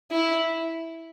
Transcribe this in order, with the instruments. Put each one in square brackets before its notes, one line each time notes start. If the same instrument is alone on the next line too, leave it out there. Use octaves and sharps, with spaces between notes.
[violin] E4